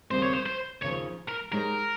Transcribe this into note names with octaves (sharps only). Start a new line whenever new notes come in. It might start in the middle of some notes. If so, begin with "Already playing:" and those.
D#2 C#3 G3 C4 C5
C#5
C5
C5
D#2 C#3 F3 C#5
A#4
G#3 D#4 G4 A#4 C#5